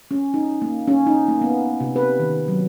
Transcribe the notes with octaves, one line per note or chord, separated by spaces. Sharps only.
C#4
D#4
A#3
C#4
D#4
A#3
B3
C3
B4
D#3
F#3